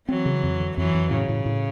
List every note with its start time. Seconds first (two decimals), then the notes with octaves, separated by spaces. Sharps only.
0.09 E3 F#3 C4
0.26 C#3
0.43 F2
0.60 D3
0.77 F2 E3 F#3
0.94 F2
1.11 A2 C#3
1.29 A2
1.46 A2